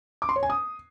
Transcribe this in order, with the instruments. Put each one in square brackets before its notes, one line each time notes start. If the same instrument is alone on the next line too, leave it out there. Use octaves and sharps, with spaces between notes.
[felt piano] D6
C6
C#5
G#5
D#6